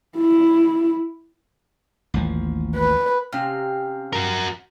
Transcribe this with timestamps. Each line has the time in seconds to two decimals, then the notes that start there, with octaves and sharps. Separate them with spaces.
0.17 E4
2.14 A1 D#2 F3
2.75 B4
3.33 C3 C#4 F5 F6
4.13 F#4 A#4